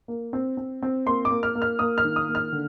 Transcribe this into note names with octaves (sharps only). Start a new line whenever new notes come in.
A#3
C4
C4
C4
A#3 C6
D6
A#3
F6
A#3
F6
A#3 D#6
F6
D#3
D#6
A#3
F6
D3